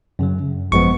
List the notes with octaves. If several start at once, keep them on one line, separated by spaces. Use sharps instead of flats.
F#2 C#3 F#3
G#1 F#2 F3 G#3 B3 C#6